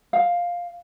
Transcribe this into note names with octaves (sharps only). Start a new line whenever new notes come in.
F5